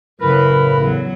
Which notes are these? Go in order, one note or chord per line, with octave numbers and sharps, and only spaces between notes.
F#2 A2 C#3 A#4 B4 B5
E2 F#3